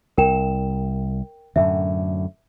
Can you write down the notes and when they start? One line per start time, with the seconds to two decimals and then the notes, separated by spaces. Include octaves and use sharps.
0.18 C2 A#4 G5 E7
1.56 F#2 A2 D3 E5